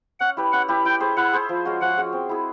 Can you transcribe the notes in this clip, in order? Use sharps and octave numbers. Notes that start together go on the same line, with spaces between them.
C#4 F#5
E4 G4 B4
C#4 F#5
E4 G4 B4
E4 G5
G#4 C5
E4 F#5
G#4 C5
F3
G#3 C#4 F#4
F3 F#5
G#3 C#4 F#4
C4
E4 G#4